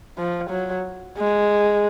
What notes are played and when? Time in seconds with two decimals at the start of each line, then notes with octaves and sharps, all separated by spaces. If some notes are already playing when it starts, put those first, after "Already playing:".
0.18 F3
0.50 F#3
1.18 G#3